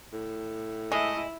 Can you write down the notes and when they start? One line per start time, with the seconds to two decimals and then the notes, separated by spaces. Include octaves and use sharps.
0.13 A2
0.92 G#3 A3 E4 D#5